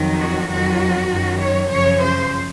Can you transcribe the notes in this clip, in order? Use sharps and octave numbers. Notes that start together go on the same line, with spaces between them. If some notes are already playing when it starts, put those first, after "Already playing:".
Already playing: F2 D#3 F#3
F#4
F2 D#3 F#3 F#4
F#2 D#3 F#3
C#5
F#2 C#3 F3 C#5
C5